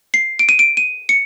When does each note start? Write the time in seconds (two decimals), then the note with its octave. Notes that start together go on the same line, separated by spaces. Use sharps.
0.14 C7
0.39 D7
0.49 D#7
0.59 D7
0.77 D#7
1.09 C#7